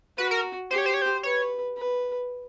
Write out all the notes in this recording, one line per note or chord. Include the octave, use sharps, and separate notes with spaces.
F#4 B4
A#4
G4 C5
C#5
C5
C#5
C5
B4 C#5
B4